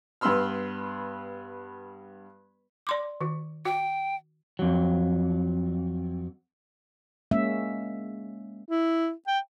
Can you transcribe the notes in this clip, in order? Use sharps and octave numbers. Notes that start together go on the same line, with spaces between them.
G2 B3 B4 C6 E6 F6
D5 C6 D6
D#3 F#4
F#4 G5
F2 F#3
G#3 A#3 C#4 E5
E4
G5